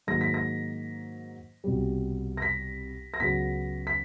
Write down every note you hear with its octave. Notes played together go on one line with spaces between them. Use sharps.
G#2 D#3 F#3 A#3 D#4 A#6
B6
A#6
C2 B2 G3
A#6
B6
A#6
C#2 C#3 F#3 B3 B6
B6